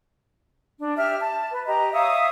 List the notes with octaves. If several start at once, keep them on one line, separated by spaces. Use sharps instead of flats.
D4
G4 E5 F6
A5
B4
G4 D#5 A#5
C#5 E5 F5 D#6